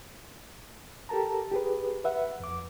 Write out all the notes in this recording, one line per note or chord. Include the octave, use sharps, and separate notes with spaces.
G4 A4 A#4 A5 A#5
G4 G#4 B4
B4 E5 F#5
F2 D6